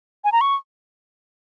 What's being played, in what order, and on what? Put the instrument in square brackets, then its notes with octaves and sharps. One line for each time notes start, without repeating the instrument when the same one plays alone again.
[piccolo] G#5
A#5
C#6